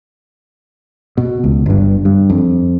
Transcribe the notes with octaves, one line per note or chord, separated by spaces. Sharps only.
B2
C#2
G1 G2
G2
F2